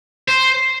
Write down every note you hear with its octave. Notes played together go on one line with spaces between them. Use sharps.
C5